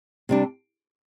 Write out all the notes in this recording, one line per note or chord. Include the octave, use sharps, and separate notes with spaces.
C3 G3 D4